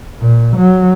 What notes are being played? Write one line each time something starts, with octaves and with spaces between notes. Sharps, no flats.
A#2
F#3